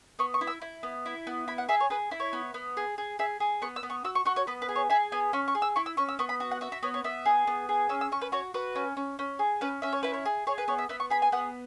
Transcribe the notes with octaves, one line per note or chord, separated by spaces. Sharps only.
B3 C#6
C#6
E4
E6
E4
B3
E4
B3
E4 B5
F#5
G#4 E5
C#5
G#4 B4
E4
C#5
B3
B3
G#4
G#4
G#4 E5
G#4
B3 C#6
E6
B3
C#6
F#4 E6
C#6
F#4 C#6
C#5
B3 B4
B4
G#4
C#5
G#4 E5
B3 G#5
C#4 C#6
C#6
G#4
E6
E4 C#6
E6
C#4 C#6
E6
B3 C#6
B5
F#4
F#5
F#4 E5
E5
B3 C#5
C#5
B3 E5
G#4
B3
G#4
C#4 E6
E6
C#4 C#6
B4
F#4 C#5
F#4 B4
C#4
C#4
C#4
G#4
C#4 B4
C#4 E5
C#5
E4 B4
C#5
G#4
G#4 C#5
B4
B3 C#5
E5
B3 E5
C#6
G#4 B5
G#5
B3 F#5